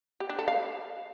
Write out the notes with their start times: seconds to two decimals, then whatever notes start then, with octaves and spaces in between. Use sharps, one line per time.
0.20 G4
0.29 D4
0.39 A4
0.48 F5